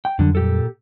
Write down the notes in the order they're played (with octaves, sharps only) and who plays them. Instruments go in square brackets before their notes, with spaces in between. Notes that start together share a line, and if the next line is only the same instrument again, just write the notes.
[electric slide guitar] G5
[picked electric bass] F2 F#3 G3 [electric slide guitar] D3
[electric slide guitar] A#2 G4 A4